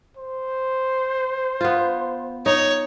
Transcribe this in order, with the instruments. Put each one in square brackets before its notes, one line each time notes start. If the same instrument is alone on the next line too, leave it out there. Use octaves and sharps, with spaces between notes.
[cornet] C5
[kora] B3 F4
[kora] D#4 [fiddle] C#5